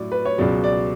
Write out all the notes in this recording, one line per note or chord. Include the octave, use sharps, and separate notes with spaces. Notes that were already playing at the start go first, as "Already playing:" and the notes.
Already playing: A2 F#3 D5
B4
C#5
C#2 B2 F#3 D5
D5